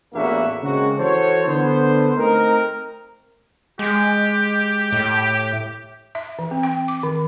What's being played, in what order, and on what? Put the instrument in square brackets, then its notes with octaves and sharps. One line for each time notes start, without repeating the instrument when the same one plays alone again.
[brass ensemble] A1 E2 A#3 D4 F#4 E5
C#3 G#3 A#3 C4 F#4
E3 F#4 A4 C5 C#5
D3 B3 C5
A3 C4 D#4 A#4
[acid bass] G#3 [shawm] G4
[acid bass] A2
[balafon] E5
E3
C4
G5
D6
D#3